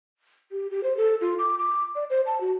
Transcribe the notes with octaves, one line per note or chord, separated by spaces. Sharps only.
G4
G4
C5
A4
F4
D6
D6
D5
C5
A5
F#4